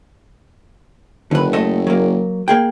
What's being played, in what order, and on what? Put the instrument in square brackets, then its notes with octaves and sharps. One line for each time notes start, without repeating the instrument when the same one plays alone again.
[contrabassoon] F#1 [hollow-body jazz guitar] D3 B4
[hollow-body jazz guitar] A3 A4 D#5
F#3 A#3
A#3 G#4 G5